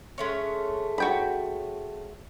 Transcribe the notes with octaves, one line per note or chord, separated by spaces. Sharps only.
G#3 A3 C#4
F#4 G5 B5